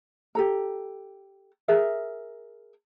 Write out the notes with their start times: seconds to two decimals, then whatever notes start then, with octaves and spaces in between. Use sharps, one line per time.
0.35 G4 A4 A#5
1.68 G#4 A#4 E5